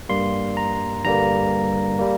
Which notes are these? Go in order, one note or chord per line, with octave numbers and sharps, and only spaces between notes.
G2 G3 A#3 C6
A#5
G2 D3 G3 A#3 A#5
G3 A#3